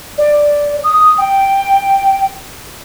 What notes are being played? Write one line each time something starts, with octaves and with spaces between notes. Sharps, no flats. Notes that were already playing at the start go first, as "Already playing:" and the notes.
D5
D#6
G5